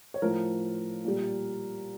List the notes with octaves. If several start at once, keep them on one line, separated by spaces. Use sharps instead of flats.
C#5
A2 F3 A#4
A#2 G3